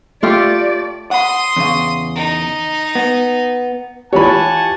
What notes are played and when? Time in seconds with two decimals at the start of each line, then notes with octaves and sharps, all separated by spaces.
0.23 A3 F4 G4 D5
1.11 F#5 B5 C6 D#6
1.56 E2 C#3 F5
2.16 D#4
2.95 B3
4.13 E3 F4 G4 C#5 F#5 G#5 A5 B5